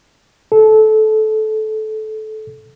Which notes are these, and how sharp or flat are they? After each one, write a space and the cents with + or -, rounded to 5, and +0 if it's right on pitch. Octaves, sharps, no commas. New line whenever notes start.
A4 -20